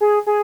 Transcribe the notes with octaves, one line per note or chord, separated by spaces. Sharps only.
G#4
G#4